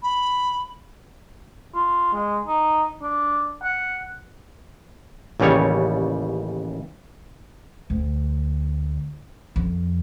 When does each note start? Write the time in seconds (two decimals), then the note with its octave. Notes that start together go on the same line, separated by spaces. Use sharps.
0.03 B5
1.74 F4
2.13 G#3
2.47 D#4
3.03 D4
3.64 F#5
5.40 A1 D#2 C#3 G3 C#5
7.90 D2
9.56 F2